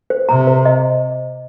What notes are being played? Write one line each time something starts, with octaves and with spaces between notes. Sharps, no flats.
C5
C3 A#5
C5
D#5